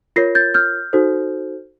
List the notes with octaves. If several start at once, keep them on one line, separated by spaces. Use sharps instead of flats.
F4 A#4 C#5 A#6 C7
G6 A6
F6 G6
D#4 F#4 A4 C5